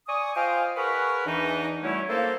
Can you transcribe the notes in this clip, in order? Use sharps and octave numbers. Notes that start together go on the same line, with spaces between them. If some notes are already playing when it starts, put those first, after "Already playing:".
D5 G#5 C#6 D#6
F4 C5 D#5 F5 G5 G#5
G#4 A#4 B4 F#5 B5 C#6
E2 E3 D4 D#4
F#3 G3 A3 C#4 E4
A#3 A4 C5